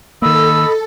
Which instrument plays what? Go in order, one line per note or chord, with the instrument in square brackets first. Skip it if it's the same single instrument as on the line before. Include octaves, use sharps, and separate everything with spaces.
[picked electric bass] D#3 A#3 [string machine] A4 [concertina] D#5 B5 [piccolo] E6